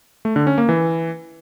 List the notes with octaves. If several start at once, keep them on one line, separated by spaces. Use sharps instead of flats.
A3
D3
C#4
A#3
E3